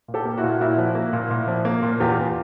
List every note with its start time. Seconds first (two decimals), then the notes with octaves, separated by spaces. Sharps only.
0.08 A#2
0.14 G4 A4
0.25 A#3
0.38 E4 F#4
0.44 A#2
0.61 A#2 E4 F#4
0.78 F3
0.95 A#3
1.13 A#2
1.30 A#2
1.47 F3
1.65 A#3
1.82 A#2
2.00 E2 F4 G4
2.18 E2